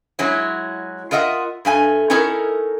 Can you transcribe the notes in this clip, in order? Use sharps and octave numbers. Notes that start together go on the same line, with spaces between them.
F#3 G#3 C#4 E4
F4 A#4 D#5 E5 F#5
G2 A3 G#5
C#4 D#4 E4 A4 A#4